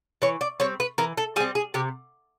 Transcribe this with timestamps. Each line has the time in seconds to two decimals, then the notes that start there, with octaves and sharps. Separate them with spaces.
0.22 E3 C#5
0.41 D5
0.60 G3 C4 C#5
0.80 B4
0.98 E3 A#4
1.17 A4
1.36 G3 G#4
1.40 C4
1.55 G#4
1.74 C3 G4